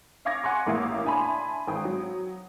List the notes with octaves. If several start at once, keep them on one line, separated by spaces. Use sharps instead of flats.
E5 F5 C#6 D6 G#6 A#6
F#5 G#5 C6 C#6
A1 A2 A#3 E5 F5
D4 E5 G#5 A5 B5 C6
G#1 E3 G5 D#6
F#3